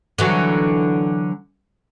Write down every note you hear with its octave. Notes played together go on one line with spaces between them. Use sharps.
D3 E3 F#3